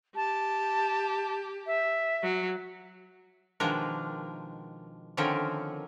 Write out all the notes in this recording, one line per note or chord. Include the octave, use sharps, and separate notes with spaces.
G4 A5
E5
F#3
B2 D#3 F3 G#3 D4 A#4
D3 D#3 F3 C4 C#4 A#4